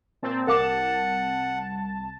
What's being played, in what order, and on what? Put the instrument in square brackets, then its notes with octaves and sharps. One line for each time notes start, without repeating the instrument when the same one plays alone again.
[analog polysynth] A#2 C4 A5
[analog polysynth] C2 A5 [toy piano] A#4 F5 D6 [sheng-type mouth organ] F#5